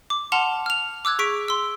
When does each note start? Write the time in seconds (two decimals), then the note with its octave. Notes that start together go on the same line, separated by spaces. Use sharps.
0.10 D6
0.32 F#5 A5 C6 F6 F7
0.66 F6 F7
1.05 D6 E6 F#6 G#6
1.19 G#4 C#6 B6 D7
1.48 C6 E6